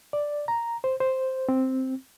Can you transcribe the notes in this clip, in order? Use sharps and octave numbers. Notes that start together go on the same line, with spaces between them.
D5
A#5
C5
C5
C4